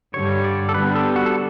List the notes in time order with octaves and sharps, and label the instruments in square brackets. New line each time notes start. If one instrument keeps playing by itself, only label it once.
[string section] G2 D3 G3 [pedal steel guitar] C#5
[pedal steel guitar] D5
A4
[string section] D3 G3 B3 [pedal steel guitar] B4
[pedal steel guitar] A4
F#4
A4